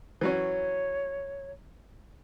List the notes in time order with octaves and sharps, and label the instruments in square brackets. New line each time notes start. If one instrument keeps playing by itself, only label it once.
[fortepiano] E3 F#3 C#4 [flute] C#5